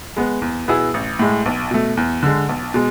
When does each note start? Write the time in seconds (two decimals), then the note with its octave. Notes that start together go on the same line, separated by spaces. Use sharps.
0.17 G#3 B3
0.42 E2
0.68 B2 B3 E4 G#4
0.94 A1
1.19 A2 G#3
1.46 B1
1.71 B2 A3
1.97 E2
2.23 D3 G#3
2.49 B1
2.74 B2 G#3